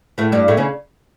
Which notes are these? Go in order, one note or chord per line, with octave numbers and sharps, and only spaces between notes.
A2 A3
G2 G3
A2 A3
C#3 C#4